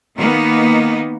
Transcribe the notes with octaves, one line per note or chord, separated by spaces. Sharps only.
D#3 A#3 B3 D#4